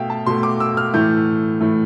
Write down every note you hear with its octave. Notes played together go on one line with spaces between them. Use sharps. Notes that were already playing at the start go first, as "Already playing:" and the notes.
Already playing: B2 A3 E5 F5 G5
A5
B2 A3 C6
D6
E6
F6
A2 E3 A3 G6
A2 E3 A3